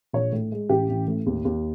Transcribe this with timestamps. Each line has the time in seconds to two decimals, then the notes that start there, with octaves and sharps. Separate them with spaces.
0.13 A#1 C#5
0.32 A2
0.52 G#3
0.69 A1 G4
0.89 A1
1.08 A2
1.26 D#2
1.45 D#2